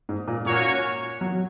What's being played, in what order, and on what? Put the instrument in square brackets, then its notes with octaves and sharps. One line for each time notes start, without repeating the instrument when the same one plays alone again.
[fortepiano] G#2
A#2
[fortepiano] A#2 [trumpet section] A#3 C#4 F#4 C#5
[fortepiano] F#3